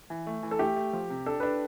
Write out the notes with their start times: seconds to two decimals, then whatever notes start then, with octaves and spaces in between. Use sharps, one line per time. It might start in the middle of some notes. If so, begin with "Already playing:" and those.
0.10 E3
0.27 A3
0.43 E3
0.51 A4
0.59 A3 G4
0.76 A3
0.93 F3
1.10 C3
1.26 D4 A4
1.40 D4 B4